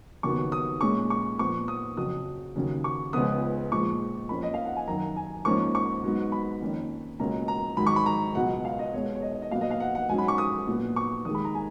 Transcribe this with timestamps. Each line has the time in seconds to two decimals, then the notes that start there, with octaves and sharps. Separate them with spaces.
0.23 D#2 C#3 F#3 B3 C#6
0.52 D#6
0.81 A#2 G#3 C#4 C#6
1.10 C#6
1.39 A#2 F3 B3 C#6
1.68 D#6
1.97 F2 C#3 F#3 D#6
2.55 D#2 C#3 F#3 C#4
2.84 C#6
3.13 C#2 C#3 F3 B3 D#6
3.71 A#2 F3 G#3 C#6
4.29 F2 F3 A#3 C#4 B5
4.43 D#5
4.54 F5
4.65 F#5
4.76 G#5
4.87 F#2 D#3 F#3 A#5
5.16 G#5
5.45 G#2 F3 A#3 C#4 C#6
5.75 C#6
6.03 G#2 F#3 B3
6.32 B5
6.61 F2 D#3 A#3 C#4
7.19 C#2 B2 F#3 A#3 C#4 A#5
7.48 A#5
7.77 G#2 D#3 F#3 B5
7.87 C#6
7.96 B5
8.06 A#5
8.35 C#2 B2 F#3 F#5
8.65 F5
8.79 D#5
8.93 B2 G#3 B3 C#5
9.15 C#5
9.22 D#5
9.32 D#5
9.42 D#5
9.51 A#2 F#3 B3 F5
9.61 D#5
9.71 F5
9.80 F#5
9.95 F#5
10.09 G#2 F#3 C#4 G#5
10.18 B5
10.28 C#6
10.38 D#6
10.68 A#2 F#3 B3
10.96 C#6
11.25 D#2 D#3 G#3 D#6
11.35 B5
11.45 A#5
11.55 G#5